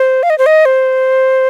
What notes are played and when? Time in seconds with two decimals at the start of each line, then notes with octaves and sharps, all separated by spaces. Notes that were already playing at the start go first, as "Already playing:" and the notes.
Already playing: C5
0.23 F5
0.30 D#5
0.38 C5
0.46 D#5
0.65 C5